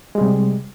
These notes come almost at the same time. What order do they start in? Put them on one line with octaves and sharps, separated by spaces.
G#3 G3 C3